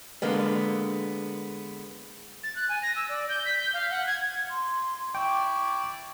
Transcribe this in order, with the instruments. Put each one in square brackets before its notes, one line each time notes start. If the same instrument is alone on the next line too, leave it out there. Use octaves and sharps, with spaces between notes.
[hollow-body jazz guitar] D3 G#3 A#3 B3
[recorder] A6
F#6
G#5
A#6
E6
D5
G6
B6
G6
F5
F#5
G#6
[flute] C6
[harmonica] E4 D5 [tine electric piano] G5 [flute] C#6